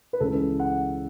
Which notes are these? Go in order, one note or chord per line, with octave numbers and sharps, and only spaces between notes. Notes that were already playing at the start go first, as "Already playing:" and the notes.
B4
C#2 C#3 E3 A4
F#5